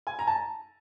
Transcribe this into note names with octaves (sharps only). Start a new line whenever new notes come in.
G#5
A#5
A5